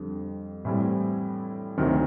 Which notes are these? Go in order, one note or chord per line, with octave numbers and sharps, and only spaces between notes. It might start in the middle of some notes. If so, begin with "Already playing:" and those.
Already playing: F2 D3 G3
A2 E3 G3 C4 E4
D2 C3 D#3 F#3